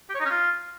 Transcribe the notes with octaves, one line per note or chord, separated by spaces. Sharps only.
G4
C#5
D#4
C#4
F4